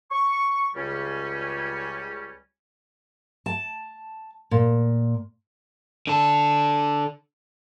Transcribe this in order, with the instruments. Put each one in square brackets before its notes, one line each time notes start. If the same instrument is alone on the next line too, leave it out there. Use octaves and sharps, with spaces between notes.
[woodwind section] C#6
C#2 C#3 G3 C#4
[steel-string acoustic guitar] A5
A#2
[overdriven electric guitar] D3 A4